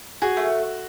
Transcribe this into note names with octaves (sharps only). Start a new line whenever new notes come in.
F#4 G#4
A3